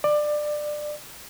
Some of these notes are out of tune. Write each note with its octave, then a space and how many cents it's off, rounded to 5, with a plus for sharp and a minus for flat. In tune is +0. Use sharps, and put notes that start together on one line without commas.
D5 +20